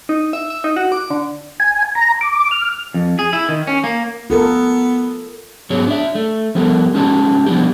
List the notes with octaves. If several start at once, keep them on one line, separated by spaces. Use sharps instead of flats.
D#4
E5
E5
D#4
F#4
D6
D3
G#5
A#5
D6
F6
F2
G#4
E4
D#3
C#4
A#3
B3 F4 A4 A#4
G#2 F#3 B3 G#4 C#5
D4 E5
A3
F3 G3 B3 G4 A4 A#4
G#3 C#4 D#4 F#4 A#4 A5
F3 G3 B3 D4 G4